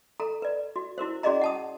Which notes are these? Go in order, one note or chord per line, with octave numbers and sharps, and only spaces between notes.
A4 A#5
B4 D5
F#4
E4 F#4 A#4 C5
C#4 F#4 G#4 D5 D#5 A#5
F#5 A5 D#6